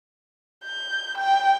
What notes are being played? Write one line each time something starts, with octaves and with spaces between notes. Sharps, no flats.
G6
G5